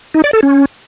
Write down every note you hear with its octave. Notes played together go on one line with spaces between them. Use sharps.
D#4
D5
A4
C#4